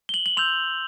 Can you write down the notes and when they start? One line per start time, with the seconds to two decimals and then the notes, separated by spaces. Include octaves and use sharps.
0.09 G7
0.14 F#7
0.26 F#7
0.37 C6 E6 G6 F7